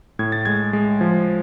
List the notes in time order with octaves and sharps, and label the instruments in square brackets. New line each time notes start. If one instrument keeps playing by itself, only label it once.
[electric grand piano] A2 G#6
A6
G#3 G#6
G#3
F3